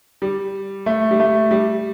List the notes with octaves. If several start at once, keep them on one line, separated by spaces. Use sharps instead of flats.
G3
A3
G3
A3
G3